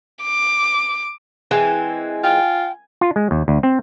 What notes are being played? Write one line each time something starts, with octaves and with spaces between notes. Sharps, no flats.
D6
E3 G#3 C4 G#5
F4 G5
F4
G#3
D#2
D2
C4